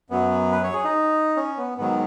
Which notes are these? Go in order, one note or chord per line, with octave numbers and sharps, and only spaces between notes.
F#2 F#3 B3
B4
C#5
G#4
D#4
C#4
B3
G#2 D#3 F#3 B3